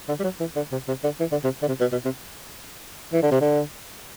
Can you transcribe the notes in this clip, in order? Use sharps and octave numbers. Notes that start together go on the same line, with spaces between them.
D3
G3
F#3
E3
D3
C3
C3
D3
E3
D3
C3
D3
C3
B2
B2
C3
E3
D3
C3
D3